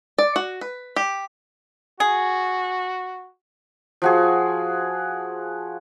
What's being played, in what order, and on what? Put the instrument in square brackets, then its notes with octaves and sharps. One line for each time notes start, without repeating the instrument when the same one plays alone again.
[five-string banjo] D5
F#4
B4
G4
[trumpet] F#4 [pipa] G#4
[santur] F3 F#4 G#4